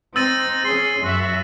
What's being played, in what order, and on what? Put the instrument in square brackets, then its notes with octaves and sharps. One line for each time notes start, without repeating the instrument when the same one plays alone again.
[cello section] C4 [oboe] D#4 [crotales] E6 A6 D#7
[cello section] C#4 G#4 [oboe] C6
[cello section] F#2 E5 [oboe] F#4